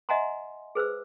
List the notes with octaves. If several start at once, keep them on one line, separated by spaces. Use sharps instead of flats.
D#5 E5 F#5 G#5 A#5 C6
G#4 B4 C5 E6